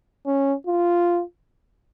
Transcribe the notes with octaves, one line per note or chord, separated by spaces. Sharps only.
C#4
F4